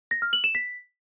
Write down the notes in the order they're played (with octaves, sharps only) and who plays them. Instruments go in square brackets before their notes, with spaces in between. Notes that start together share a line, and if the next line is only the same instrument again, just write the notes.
[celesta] A#6
F6
F#7
E7
B6